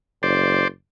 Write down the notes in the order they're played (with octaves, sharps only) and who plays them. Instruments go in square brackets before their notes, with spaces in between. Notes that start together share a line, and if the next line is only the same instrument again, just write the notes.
[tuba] F#1 [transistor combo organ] C5 D5